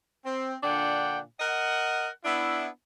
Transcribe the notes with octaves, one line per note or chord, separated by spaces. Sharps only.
C4
A#2 D3 D4 F#5 G5
A#4 D#5 F#5
B3 D4 E4